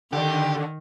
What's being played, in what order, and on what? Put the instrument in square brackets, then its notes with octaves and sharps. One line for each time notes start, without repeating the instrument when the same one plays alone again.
[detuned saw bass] D3 [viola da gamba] D#3 [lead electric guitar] G4